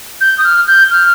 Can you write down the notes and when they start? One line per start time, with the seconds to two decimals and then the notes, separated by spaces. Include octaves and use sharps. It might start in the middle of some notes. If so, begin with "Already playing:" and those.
0.21 G6
0.38 D#6
0.44 F6
0.67 G6
0.91 F6